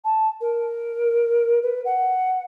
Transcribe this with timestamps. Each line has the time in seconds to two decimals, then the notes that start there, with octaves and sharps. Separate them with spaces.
0.05 A5
0.41 A#4
1.63 B4
1.85 F#5